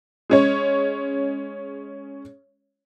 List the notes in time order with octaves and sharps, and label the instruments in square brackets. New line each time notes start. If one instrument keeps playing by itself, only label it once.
[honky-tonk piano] G#3 C#4 C#5